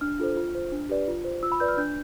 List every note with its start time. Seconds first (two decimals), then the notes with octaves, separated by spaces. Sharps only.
0.01 D4 F6
0.20 F4 A4 C5
0.37 F4
0.55 C5
0.72 D4
0.89 G4 B4 D5
1.08 F4
1.25 C5
1.43 F4 E6
1.52 B5
1.60 B4 D5 G6
1.68 F6
1.77 D4 G6